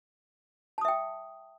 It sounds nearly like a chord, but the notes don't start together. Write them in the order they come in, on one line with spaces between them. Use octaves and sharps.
A5 D#6 E5 G5